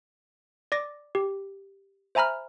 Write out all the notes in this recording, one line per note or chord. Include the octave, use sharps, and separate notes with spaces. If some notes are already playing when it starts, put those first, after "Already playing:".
D5 D6 A#6
G4
C5 E5 G#5 A#5 B5 F6